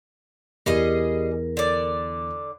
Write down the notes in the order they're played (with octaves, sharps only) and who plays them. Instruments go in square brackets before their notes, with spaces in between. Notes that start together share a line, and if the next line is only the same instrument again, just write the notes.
[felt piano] E2 [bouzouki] G3 G#4 D#5 [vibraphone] A#4
[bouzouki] D3 D5